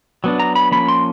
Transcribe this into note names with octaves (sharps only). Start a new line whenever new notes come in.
F#3 B3 D4
A#5
B5
F3 A#3 C#4 B5
C6